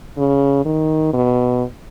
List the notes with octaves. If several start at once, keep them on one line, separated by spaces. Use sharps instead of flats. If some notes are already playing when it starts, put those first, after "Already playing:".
C#3
D#3
B2